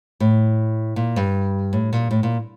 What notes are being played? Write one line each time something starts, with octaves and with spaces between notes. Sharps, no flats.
A2
A#2
G2
A2
A#2
A2
A#2